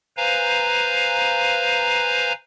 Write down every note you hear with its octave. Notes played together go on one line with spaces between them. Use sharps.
B4 C5 F5 G#5 A#5